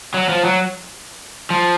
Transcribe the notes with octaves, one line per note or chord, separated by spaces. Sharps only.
F#3
F3
F#3
F3